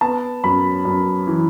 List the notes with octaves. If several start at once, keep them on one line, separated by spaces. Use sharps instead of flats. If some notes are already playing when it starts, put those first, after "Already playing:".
B3 A5
F#2 B5
F#2
E3